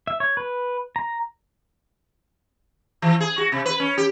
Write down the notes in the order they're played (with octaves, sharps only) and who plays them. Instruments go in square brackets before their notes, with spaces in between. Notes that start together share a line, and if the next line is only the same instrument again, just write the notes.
[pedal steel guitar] E5
C#5
B4
A#5
[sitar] E3
G#4
F#4
C3
B4
C#4
G4